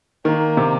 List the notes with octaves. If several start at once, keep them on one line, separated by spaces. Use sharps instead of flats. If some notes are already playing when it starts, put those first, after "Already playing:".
D#3 A#3
C3